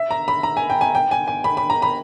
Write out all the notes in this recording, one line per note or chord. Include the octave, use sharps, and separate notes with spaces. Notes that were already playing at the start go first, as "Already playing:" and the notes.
Already playing: E5
A#5
B5
A#5
G#5
G5
G#5
G5
G#5
G#5
B5
B5
A#5
B5